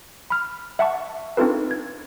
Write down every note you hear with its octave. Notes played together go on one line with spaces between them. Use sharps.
B5 F6
E5 F#5 A5 C#6
C4 D4 D#4 F4 A4 B4
G#6